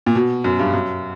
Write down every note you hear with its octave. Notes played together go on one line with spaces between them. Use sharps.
A#2
B2
F#2
G2
F#2